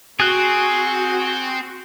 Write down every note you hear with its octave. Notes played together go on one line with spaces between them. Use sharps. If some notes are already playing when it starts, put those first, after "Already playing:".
C4 F#4 G#4 F#6